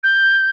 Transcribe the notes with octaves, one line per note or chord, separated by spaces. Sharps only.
G6